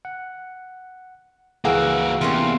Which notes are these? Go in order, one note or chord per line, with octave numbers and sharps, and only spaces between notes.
F#5
C#2 E3 A#3 F#4 G#4 F5 F#5 E6
E2 C3 A#3 C4 C#4 F4